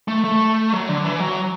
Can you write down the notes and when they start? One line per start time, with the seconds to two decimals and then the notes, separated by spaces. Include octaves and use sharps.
0.08 A3
0.25 A3
0.73 F#3
0.89 D3
1.04 E3
1.20 F#3